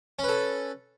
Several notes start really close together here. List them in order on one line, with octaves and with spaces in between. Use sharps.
C#4 B4 A4